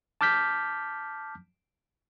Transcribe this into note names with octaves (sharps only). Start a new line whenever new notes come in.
A5 D6 F6 G6 B6